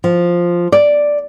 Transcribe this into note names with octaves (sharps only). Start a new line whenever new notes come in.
F3
D5